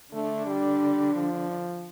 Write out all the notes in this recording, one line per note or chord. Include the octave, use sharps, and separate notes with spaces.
D3 A3 D4
G3
F3